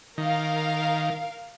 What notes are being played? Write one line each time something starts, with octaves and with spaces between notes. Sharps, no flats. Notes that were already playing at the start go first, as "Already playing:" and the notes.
D#3 A#4 F5